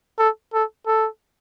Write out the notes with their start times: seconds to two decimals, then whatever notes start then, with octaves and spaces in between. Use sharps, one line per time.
0.18 A4
0.53 A4
0.87 A4